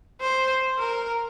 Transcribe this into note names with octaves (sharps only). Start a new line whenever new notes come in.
C5
A#4